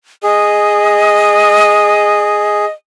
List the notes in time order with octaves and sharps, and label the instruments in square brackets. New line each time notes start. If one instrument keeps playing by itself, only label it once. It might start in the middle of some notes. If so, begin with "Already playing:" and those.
[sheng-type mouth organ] G#4 [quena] D#5